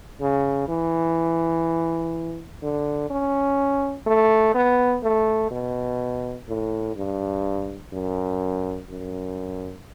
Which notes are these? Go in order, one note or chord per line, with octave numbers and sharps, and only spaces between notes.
C#3
E3
D3
C#4
A3
B3
A3
B2
A2
G2
F#2
F#2